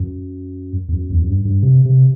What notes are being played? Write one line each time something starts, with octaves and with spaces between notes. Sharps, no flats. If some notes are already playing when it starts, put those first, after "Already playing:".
Already playing: F#2
E2
F#2
E2
F#2
G2
G2
C3
C3